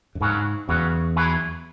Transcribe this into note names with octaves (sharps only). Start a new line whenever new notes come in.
F#2
G#2 C#3 F#3 C#4 F#4
E2 C#3 F#3 C#4 F#4
F#3 E4 G#4 B4